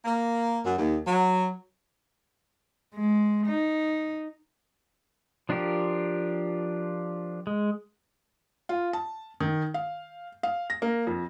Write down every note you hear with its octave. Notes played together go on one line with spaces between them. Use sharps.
A#3
F#2
D#2
F#3
G#3
D#4
F3 D4 F4 G4 A#4
G#3
F4
A5
D#3
F5
F5
A#6
A#3
F2